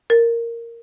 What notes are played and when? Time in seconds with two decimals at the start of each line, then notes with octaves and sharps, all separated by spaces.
0.10 A#4